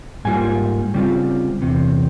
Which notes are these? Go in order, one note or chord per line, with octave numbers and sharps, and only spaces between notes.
G#2 G3 A#3 F4 G#5
C#3 G3 C4 F4
E2 C3